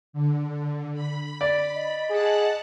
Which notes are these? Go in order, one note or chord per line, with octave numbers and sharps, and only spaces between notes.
D3
B5
D5
D#5
G#4 F#5 A5 F#6